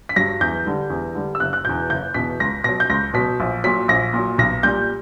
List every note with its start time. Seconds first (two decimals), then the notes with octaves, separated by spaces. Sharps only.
0.09 B6
0.16 G2 F#3 A#6
0.41 E2 G6
0.66 D3 G3
0.90 E2
1.15 D3 G3
1.35 E6
1.40 F#1 F#6
1.53 F#6
1.65 E2 B2 G6
1.90 F#1 G6
2.14 E2 B2 B6
2.40 C#2 A#6
2.64 B2 F#3 A#6
2.80 G6
2.90 C#2 A#6
3.14 B2 F#3 B6
3.40 A#1
3.64 A#2 F#3 B6
3.88 A#1 A#6
4.13 A#2 F#3
4.38 B1 A#6
4.63 A#2 G3 G6